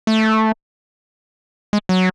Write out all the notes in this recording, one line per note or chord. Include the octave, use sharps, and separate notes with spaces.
A3
G#3
F#3